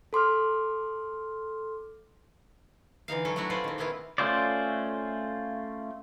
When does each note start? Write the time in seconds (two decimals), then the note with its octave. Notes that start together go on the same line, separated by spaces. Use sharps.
0.13 A4 C6 D6 F6
3.08 D3 E3 D#4 F5
3.25 F#3 C#4 E4 A4
3.36 F#3 A3 D4 E4 F#4 G4
3.50 C#4 E4 F4 B4 C5 D5
3.64 D#3 C4
3.78 A#3 B3 C#4 E4 F4
4.18 A3 C#4 F4 C5 D5